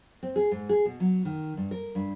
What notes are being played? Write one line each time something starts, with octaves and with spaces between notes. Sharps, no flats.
C4
G#4
G#2
G#4
B2
F#3
D#3
G2
A#4
G2